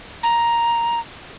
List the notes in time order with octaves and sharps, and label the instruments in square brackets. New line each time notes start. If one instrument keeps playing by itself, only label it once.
[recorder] A#5